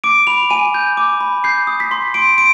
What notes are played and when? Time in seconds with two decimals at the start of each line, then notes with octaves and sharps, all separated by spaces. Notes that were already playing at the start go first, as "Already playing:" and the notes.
0.04 D6 D7
0.27 B5 F7
0.50 G#5 D#7
0.74 G6
0.97 D6
1.21 B5
1.44 G6 C7
1.67 D#6
1.80 B6
1.91 C6
2.14 C6 D7
2.38 D7